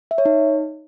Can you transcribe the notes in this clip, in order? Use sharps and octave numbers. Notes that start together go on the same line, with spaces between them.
E5
C#5
D#4